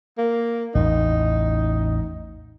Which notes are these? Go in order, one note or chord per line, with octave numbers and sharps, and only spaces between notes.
A#3
A1 E2 D#4